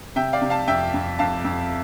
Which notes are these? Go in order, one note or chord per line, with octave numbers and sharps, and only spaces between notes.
C3 E5 G5
D5 F5
C3
F5 A5
F2 E5 G5
F2
F2 F5 A5
F2